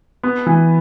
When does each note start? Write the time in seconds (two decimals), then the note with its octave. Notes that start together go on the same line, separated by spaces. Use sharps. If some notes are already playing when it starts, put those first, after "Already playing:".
0.23 B3
0.46 E3